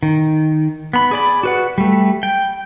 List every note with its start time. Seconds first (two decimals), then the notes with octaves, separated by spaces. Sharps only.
0.03 D#3
0.93 B3 B5
1.11 G#4 D5 B5
1.43 F#4 B4 F#5
1.78 G3 A3
2.23 G5